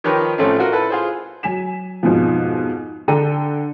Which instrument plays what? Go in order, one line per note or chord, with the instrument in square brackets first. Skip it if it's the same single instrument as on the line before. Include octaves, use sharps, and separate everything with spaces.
[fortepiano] D#3 F3 G4 A#4 B4 C#5
A1 F3 A3 C4 C#4
F4 F#4 A#4 F#5
E4 A4 B4
F4 G#4 C5
[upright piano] F#3 G#5 B6 E7
F2 G#2 B2 F3
D3 D4 A4 G5 A#5 D#7